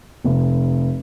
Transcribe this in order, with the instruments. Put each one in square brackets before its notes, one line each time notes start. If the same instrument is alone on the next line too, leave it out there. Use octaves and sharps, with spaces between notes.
[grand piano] F1